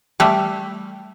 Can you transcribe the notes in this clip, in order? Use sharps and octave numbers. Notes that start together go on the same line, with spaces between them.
G3 A3